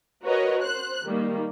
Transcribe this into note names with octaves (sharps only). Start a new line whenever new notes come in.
F#4 A#4 B4 C#5 D#5
C5 F#6
D#3 G3 A#3